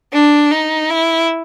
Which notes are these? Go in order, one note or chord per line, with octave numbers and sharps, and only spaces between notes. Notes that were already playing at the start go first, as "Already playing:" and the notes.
D4
D#4
E4